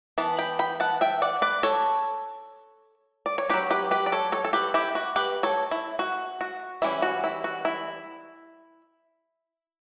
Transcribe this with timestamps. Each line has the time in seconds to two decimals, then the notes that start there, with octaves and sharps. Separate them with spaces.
0.18 E3 B3 A5
0.39 G5 B5
0.59 G5 B5
0.80 F#5 A5
1.01 E5 G5
1.22 D5 F#5
1.42 B4 D5
1.63 A4 C#5
3.26 D5
3.38 C#5
3.50 F#3 C#4 G4 B4
3.71 G4 B4
3.91 G4 B4
4.06 D5
4.12 A4 C#5
4.32 A4 C#5
4.45 A4
4.53 G4 B4
4.74 E4 G4
4.95 F#4
5.16 G4 B4
5.43 A4 C#5
5.71 E4
5.99 F#4
6.41 F#4
6.82 E3 G3 C#4 E4
7.02 F#4
7.24 E4
7.44 F#4
7.65 E4